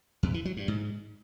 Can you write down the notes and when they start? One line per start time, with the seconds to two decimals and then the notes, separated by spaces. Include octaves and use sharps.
0.23 E2
0.34 E3
0.45 F#3
0.57 G2
0.68 G#2